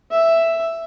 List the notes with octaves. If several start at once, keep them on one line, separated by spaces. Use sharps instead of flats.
E5